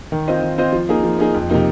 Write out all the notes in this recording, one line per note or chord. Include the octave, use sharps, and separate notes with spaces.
D#3
C4 F4 C5 D#5
D#3
C4 F4 C5 D#5
F3
A#3 D#4 G#4
F3
A#3 D#4 G#4
F2
C3 F3 A#3 D#4